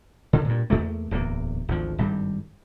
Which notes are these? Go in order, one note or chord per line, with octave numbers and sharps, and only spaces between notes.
D3
G2 A#2
E2 A3 A#3
D1 E2 E3 A#3
G#1 D2 F3
G#1 G2 G3